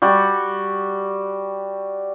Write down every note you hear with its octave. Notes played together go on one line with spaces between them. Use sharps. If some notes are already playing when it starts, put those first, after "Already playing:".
G3 F#4